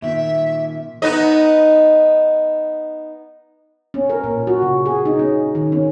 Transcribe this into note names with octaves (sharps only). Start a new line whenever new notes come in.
A#2 D#3 E5
B3 D#4 D#5
C#4
A#4
A#2
F#4
C#3
G#4
D#4
C#4
D#3
C#4